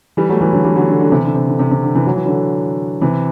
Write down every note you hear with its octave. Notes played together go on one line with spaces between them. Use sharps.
E3 G3
F#3 A3
E3 G3
D3 F#3
E3 G3
D3 F#3
D3
D3
C3 E3
D3
C3
D3
C3
C3
D3
C3 E3
F#3
E3
D3 F#3
C3 E3